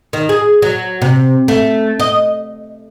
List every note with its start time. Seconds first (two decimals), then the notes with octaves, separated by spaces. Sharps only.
0.13 D#3
0.29 G#4
0.62 F#3
1.02 C3
1.48 A3
2.00 D#5